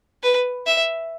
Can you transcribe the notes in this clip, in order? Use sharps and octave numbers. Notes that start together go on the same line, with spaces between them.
B4
E5